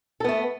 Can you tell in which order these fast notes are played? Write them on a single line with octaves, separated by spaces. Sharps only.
A4 B3 A3